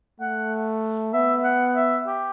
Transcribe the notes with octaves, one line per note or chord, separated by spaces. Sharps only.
A3 F#5
B3 E5
F#5
E5
G4